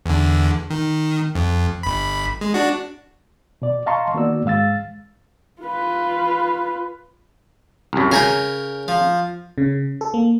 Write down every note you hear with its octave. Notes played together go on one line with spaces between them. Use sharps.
E2 D3
D#3
F2
G1 B5
G#3
D4 F#4
B2 D5
D#5 F5 A5 A#5 C6 C#6
D#3 A#3 B3 F#4 D5 E6
G#2 G#3 F5 E6 A6
F4 B4
C2 F#2
C#3 A#4 C#5 G5 G#5 A#5
F3
C#3
A4
A#3